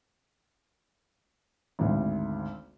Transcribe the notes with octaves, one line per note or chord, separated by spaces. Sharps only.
G#1 D2